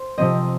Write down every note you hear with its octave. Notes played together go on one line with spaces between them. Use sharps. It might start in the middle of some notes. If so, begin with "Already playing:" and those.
Already playing: C5
C3 F3 C4 D#5